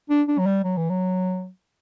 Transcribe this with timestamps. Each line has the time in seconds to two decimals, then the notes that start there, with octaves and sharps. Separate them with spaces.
0.10 D4
0.28 D4
0.39 F#3
0.46 G3
0.64 F#3
0.77 E3
0.90 F#3